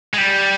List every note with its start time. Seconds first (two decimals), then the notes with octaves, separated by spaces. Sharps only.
0.14 G#3
0.18 G3